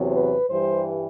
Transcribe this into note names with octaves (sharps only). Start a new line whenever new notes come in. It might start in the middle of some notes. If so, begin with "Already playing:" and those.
Already playing: E2 C3 F#3
B4
G2 E3 G3 C5